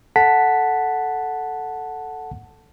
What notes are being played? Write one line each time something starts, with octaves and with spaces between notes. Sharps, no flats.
A4 F#5 A5 B6